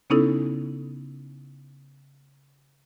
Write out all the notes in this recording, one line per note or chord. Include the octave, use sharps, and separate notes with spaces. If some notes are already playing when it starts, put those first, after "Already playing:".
C#3 B3 C#4 D#4 E4 A4